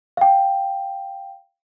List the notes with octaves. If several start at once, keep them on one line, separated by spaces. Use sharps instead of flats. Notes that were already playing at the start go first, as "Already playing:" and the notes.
F5 G5